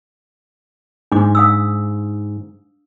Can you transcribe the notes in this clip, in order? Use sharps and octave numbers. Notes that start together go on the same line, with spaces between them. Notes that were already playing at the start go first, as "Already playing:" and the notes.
G#2 D4 D6
F5 D#6 E6